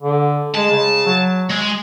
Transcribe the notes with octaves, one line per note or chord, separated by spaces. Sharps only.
D3
G#3 A5
C#3
F#3
G#3